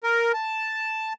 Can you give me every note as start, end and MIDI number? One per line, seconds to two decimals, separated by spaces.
0.04 0.32 70
0.33 1.13 81